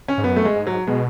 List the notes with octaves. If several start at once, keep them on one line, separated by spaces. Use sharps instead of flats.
C#4
G#2
F#2 B3
A3
G#3
G#2
F#3
B2 G#3